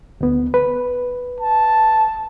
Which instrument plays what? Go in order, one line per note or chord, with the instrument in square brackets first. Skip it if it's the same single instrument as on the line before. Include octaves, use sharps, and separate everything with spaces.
[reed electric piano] D2 B3
B4
[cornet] A5